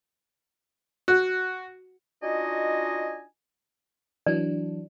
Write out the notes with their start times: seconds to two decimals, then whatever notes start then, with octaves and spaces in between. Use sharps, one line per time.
1.08 F#4
2.23 D4 D#4 F4 F#4 D#5 G#5
4.27 E3 F#3 D4 D5